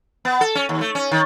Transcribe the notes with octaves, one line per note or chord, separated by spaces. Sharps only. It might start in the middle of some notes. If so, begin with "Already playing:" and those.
B3
A4
C#4
D#2
A3
C#4
D#3